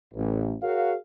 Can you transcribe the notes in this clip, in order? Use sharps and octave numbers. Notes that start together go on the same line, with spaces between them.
A1
F#4 G#4 A#4 C#5 F5